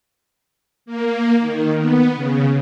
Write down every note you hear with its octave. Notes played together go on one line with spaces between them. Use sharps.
A#3
D#3
B3
C#3